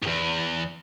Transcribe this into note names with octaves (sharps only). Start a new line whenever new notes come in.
E2 G#2